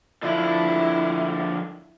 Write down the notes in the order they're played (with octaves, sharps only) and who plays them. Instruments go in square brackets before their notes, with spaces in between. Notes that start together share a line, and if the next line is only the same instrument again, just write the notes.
[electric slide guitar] D3 F3 D4 [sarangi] E4